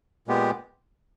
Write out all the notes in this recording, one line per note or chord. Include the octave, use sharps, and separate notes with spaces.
A#2 G#3 B3 G4